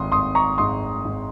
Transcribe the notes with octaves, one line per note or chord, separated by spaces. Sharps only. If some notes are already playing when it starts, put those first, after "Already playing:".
Already playing: G#1 C6 D#6
G#1 C6 D#6
A#5 C#6
G#2 C6 D#6
G#2